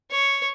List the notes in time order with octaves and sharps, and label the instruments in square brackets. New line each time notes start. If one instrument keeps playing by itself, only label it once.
[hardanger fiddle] C#5